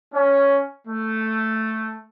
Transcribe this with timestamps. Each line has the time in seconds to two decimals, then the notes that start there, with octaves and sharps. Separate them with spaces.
0.14 C#4
0.87 A3